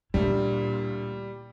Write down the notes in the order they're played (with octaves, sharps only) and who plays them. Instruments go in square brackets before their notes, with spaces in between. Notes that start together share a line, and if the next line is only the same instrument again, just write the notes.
[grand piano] D2 [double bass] A#2 [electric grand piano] G3 [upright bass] E4